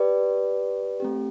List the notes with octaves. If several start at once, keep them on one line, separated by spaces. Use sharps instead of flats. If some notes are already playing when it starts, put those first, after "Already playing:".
Already playing: G4 B4 D5
A3 C4 G4